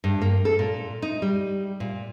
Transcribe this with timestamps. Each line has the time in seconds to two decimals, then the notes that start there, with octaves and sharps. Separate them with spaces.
0.04 G2
0.21 A#3
0.45 A4
0.59 A#2
1.02 D#4
1.22 G3
1.80 A#2